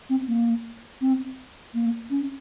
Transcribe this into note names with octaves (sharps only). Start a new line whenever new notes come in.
C4
A#3
C4
A#3
C#4